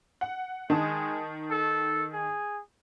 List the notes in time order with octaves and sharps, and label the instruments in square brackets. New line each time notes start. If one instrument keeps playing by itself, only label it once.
[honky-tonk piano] F#5
[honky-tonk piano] D#3 A5 D#6 [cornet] G#3
[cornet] A4
G#4